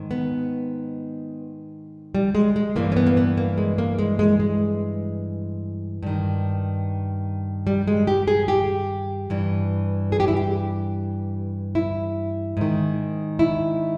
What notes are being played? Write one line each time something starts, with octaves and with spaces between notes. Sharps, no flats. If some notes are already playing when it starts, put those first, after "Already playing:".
Already playing: G#2 D#3
B3
G3
G#3
G#3
G2 E3 A#3
C#4
B3
A#3
B3
A#3
G#3
A#3
G#3
G#3
G#3
G2 D#3
G3
G#3
G4
G#4
G4
G2 E3
G#4
G4
E4
G4
E4
G#2 D#3
E4